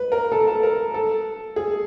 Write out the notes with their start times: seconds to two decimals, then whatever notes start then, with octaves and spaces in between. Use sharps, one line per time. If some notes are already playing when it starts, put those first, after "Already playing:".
Already playing: B4
0.12 A#4
0.32 A4
0.47 A4
0.63 A#4
0.94 A4
1.56 G#4